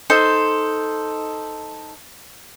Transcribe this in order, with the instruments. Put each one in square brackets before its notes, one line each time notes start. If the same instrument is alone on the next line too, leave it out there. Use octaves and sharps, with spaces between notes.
[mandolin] D#4 A4 C5 C6